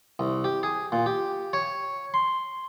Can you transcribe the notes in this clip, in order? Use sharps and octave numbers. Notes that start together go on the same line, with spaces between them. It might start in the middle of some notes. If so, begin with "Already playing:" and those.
C2
G4
G#4
A#2
G4
C#5
C6